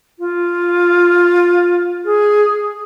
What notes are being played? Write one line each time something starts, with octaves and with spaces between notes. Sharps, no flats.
F4
G#4